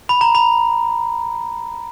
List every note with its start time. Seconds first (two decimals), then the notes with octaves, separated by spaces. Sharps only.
0.09 B5
0.21 A#5
0.35 B5